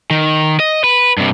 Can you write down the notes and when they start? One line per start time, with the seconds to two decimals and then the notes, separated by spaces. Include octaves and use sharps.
0.10 D#3
0.60 D#5
0.84 B4
1.17 G2 C3